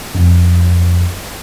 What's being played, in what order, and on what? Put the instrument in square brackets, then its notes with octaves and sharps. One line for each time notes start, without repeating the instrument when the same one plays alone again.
[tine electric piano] F2